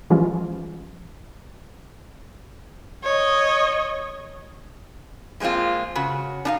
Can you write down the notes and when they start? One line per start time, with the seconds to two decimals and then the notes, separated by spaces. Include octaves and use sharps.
0.10 E3 F3 G3 G#3 C#4 F4
3.04 C#5 D#5
5.40 F3 G#3 A#3 C4 F4
5.95 C#3 F#4
6.45 D4 D#4 F5